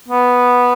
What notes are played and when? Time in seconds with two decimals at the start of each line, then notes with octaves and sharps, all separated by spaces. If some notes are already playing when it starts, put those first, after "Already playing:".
0.09 B3